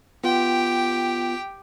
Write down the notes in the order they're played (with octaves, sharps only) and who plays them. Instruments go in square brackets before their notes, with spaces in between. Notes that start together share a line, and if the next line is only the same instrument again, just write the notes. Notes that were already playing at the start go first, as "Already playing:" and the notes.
[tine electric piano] B3 F4 [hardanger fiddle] G4 G5